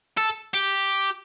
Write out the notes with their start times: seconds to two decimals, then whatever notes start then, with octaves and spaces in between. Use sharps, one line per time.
0.17 A4
0.54 G4